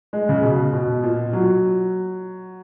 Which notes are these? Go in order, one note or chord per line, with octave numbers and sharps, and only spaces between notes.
G#3
C#3
B2
B2
A#2
F#3